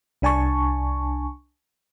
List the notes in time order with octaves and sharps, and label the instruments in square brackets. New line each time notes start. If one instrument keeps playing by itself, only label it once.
[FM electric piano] C2 D4 G#5 A5 C#6